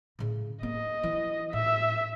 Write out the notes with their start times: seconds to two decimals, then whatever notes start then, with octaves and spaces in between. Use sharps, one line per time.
0.19 A2 C#3
0.63 A#3 D#5
1.03 E3
1.53 A2 E5